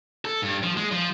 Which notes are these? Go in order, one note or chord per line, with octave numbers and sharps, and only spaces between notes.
A4
G2
F3
G#3
F3